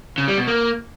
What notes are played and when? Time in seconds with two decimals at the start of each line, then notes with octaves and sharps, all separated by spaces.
0.18 C#3
0.28 G3
0.38 B2
0.47 A#3